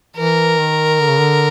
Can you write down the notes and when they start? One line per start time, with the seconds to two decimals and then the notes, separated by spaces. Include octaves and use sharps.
0.17 E3 A#4
0.59 D#3
1.00 D3
1.09 C#3
1.19 D3